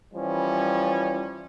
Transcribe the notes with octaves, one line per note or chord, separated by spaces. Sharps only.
E3 F3 G3 C#4